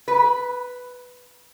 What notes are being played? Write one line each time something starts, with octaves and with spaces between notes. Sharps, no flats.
B4